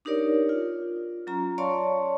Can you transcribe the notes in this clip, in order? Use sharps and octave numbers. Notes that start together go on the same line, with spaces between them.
D4 D#4 G4 A#4 C#5 D5
F4
F#3 C#4 F4 A#5
C#5 D5 F5 A5 C6 C#6